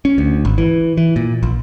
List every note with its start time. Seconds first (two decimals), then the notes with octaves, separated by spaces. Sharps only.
0.05 C#4
0.18 D2
0.45 G#1
0.58 E3
0.98 E3
1.16 A#2
1.43 A#1